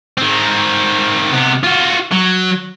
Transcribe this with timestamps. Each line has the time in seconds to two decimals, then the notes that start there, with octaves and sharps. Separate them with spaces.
0.18 D#3 C4
1.32 C3 B3
1.63 F4 F#4
2.12 F#3